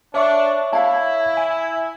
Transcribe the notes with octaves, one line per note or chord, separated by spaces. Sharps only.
D4 C#5 E5 C#6
E4 F5 A5
G#5